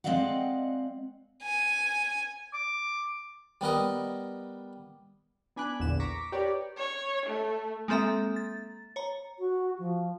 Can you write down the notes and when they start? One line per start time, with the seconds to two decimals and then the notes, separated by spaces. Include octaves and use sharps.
0.04 G#3 C4 D5 D#5 F5 F#5
1.42 G#5
2.54 D6
3.61 G3 B3 A#4 D#5
5.56 B3 D4 G#5 B5 D6 F#6
5.80 A#1 E2 D3 E7
6.00 A#5 C#6 D6 A#6 B6
6.32 G4 A#4 B4 C#5 D5
6.77 C#5
7.26 A3
7.88 G#3 A#3 C4 A4 E5 A#5
8.36 A6
8.96 C#5 A#5
9.39 F#4
9.79 F3